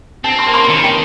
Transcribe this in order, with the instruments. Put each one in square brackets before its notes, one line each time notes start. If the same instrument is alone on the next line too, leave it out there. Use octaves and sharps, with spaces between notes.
[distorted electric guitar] C4 [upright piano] A5
[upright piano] C6
[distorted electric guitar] A#3
[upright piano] C6
[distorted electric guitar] D#3 [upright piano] A5
[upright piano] G5